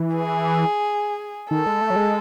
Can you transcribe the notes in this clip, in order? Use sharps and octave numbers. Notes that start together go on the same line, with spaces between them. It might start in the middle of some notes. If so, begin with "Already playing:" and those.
Already playing: E3
G#4
D#3 A4
G#3
A3
F#3
G#3